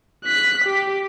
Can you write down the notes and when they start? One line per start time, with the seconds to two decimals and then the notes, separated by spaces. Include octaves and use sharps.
0.24 F#6 B6
0.65 G4